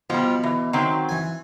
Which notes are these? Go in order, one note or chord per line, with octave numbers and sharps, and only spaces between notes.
B2 F3 G3
E3
D#3 F#3 C4
E3 G#5